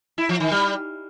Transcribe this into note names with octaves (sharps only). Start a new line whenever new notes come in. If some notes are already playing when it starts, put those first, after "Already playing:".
E4
F3
D#3
G3